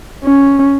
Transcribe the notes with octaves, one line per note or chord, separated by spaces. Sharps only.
C#4